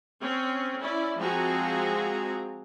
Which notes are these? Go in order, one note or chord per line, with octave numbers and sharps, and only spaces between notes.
C4 C#4
C#4 E4 D5
F3 G#3 C4 F#4 G#4 A#5